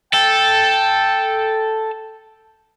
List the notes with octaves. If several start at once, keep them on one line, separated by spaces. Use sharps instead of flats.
A4 G5